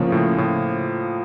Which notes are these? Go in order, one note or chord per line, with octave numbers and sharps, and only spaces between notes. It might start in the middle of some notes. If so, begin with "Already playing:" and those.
Already playing: A2 C#3 F3 A#3
A2
A2